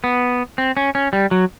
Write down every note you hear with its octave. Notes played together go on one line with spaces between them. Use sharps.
B3
C4
C#4
C#4
G3
F#3